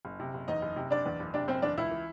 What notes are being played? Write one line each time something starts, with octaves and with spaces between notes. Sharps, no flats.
F#1
C3
F#1
E2 D#4 D#5
F#1
C3
F#1 D4 D5
E2
F#1
C3 D4 D5
F#1 C4 C5
E2 D4 D5
C#2 E4 E5
E3